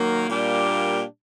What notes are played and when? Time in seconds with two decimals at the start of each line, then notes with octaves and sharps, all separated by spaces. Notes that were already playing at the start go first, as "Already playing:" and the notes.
Already playing: D#3 F#3 A#3
0.28 A#2 G3 A#3 D4 G4